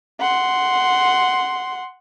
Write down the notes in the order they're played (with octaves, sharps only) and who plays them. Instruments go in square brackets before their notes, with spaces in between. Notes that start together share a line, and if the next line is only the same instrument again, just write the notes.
[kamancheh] F#5 C6